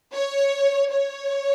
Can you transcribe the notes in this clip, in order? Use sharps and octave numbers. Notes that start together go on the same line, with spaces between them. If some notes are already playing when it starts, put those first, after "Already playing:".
C#5
C#5